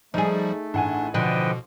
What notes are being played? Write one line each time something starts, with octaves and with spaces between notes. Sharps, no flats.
F3 G3 A3 D#4 G#4
A1 D4 F#5 G#5
B2 D3 F3 B4 D#5 G5